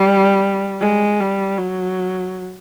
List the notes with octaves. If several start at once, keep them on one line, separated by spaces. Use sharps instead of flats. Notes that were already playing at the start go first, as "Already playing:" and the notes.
Already playing: G3
G#3
G3
F#3